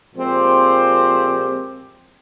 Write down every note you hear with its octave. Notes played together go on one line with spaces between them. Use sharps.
A#2 F3 G#3 C4 G4